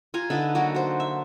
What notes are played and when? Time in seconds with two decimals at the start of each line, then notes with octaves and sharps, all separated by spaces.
0.14 F4 G#5 A#5
0.30 D3 D#4 B4 E5
0.55 F#3 A#3 F#4
0.74 F#4 C5
1.00 E5